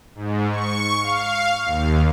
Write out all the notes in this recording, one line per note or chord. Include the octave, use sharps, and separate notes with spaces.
G#2
C#6
F5
D#2